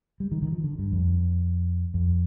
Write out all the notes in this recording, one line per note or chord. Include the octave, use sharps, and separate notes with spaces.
G3
D#3
D#3
F3
D3
G2
F2
F2